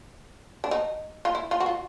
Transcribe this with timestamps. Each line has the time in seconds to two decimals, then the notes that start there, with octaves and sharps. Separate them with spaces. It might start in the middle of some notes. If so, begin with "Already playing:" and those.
0.64 D4
0.71 D#4
1.25 F4
1.35 E4
1.51 F4
1.60 F#4
1.66 F4